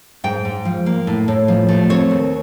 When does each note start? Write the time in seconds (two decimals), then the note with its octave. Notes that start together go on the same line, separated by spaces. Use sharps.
0.24 G#2 G5
0.45 G#2
0.65 F3
0.86 A#3
1.07 A2
1.28 A2
1.48 F3
1.69 A3
1.89 C4 C#5
2.11 D#2